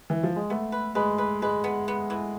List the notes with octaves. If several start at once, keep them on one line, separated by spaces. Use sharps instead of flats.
E3
F3
G#3
A3 B3
B4
G#3 B4
B4
G#3 B4
B3
B3
E3